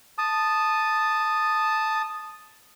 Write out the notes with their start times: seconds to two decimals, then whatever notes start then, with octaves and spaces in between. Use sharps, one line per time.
0.18 A5 D#6